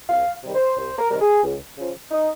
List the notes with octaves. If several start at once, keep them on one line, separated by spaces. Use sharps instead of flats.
C2 F5
C3 D#3 G3
C5
C2 C5
A#4
C3 D#3 G3 A#4
G#4
C#2
C#3 F3
D#4